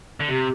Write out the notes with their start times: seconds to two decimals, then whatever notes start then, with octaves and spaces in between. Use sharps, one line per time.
0.20 D3
0.29 C3 G4